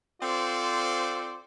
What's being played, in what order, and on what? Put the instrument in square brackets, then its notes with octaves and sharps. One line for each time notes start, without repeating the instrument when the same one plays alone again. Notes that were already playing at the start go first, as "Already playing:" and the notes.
[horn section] C4 F4 A4 C5 D5